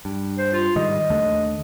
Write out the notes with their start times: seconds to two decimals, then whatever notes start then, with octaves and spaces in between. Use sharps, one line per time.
0.05 G2
0.38 C5
0.53 F4
0.75 G#2 D#3 G3 D#5
1.10 D#2 D3 A3